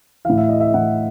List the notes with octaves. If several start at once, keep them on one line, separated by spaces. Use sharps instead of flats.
A2 E3 F5
E5
D#5
E5
A2 E3 F#5